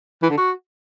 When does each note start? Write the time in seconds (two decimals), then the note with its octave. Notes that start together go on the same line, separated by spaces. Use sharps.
0.23 E3
0.30 D3
0.37 F#4